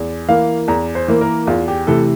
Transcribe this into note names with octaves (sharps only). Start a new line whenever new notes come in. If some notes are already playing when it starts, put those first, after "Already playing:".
Already playing: E2
E3 A#3 F5
E2 A#5
C5
E3 A#3
A#4
E2 F4
G4
C3 E3 A3 A4